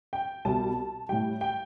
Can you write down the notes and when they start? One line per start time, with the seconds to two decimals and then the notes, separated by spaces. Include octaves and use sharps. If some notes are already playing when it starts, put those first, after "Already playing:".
0.13 G5
0.45 C2 B2 G3 A5
1.09 A2 G3 G5
1.41 G5